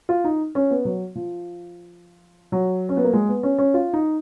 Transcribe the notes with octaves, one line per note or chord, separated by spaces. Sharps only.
F4
D#4
C#4
B3
F#3
F3
F#3
C#4
B3
A#3
G#3
B3
C#4
C#4
F4
D#4